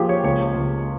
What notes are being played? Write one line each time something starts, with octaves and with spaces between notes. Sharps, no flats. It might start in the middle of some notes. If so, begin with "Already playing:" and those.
Already playing: F3 A#3 G4 G#4
C#5
C#2 C#5
C#2